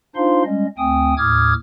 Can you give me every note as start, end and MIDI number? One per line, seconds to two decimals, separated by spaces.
0.16 0.43 62
0.16 0.43 63
0.16 0.43 65
0.16 0.43 72
0.16 0.43 77
0.16 0.43 84
0.45 0.67 55
0.45 0.67 56
0.45 0.67 61
0.45 0.67 75
0.78 1.14 38
0.78 1.14 57
0.78 1.14 60
0.78 1.14 79
0.78 1.14 80
0.78 1.14 87
1.17 1.54 39
1.17 1.54 45
1.17 1.54 86
1.17 1.54 87
1.17 1.54 89
1.17 1.54 92